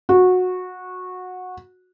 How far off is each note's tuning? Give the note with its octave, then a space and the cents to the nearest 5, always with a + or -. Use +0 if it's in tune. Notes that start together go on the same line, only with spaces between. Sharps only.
F#4 -15